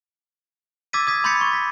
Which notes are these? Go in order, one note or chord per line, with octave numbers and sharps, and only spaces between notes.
D6 E6 G#6 A6 B6 D#7
D#6 G#6 B6
B5 C6 G6 A6 B6 C#7
C#6
B6